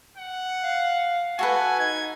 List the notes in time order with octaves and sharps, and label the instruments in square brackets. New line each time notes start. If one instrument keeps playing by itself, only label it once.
[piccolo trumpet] F#5
[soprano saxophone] F5
[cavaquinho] F#4 A4 B4 [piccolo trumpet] G#5
[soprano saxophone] D#4 [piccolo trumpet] G#6